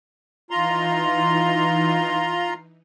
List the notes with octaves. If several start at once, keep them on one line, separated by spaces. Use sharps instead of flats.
E3 D#4 F4 A#5 C6